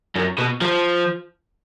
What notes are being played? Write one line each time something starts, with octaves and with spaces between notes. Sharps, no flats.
F#2
B2
F3